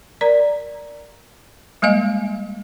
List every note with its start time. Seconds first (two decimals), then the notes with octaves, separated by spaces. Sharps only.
0.21 A#4 D5 A#5
1.82 G3 G#3 A#3 D#5 F5